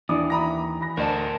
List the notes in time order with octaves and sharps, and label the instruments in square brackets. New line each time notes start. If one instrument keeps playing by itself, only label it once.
[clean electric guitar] D#2 [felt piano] E3 [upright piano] D4 D5 D#6
[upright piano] E5 B5 D#6 [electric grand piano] A#5 A#6
[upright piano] B5 A#6
[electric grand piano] D2 [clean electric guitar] A#4 C5 A5 [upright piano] D5 D#5